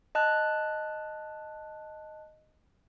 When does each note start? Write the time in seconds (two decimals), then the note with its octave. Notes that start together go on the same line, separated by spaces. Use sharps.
0.15 D#5 A5 F#6